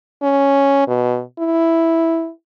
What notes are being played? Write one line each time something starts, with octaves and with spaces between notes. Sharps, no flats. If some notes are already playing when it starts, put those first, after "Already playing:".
C#4
B2
E4